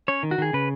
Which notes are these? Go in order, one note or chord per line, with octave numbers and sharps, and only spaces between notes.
C#4 C#5
D#3
F#4
D#3 G#4
C#3 B4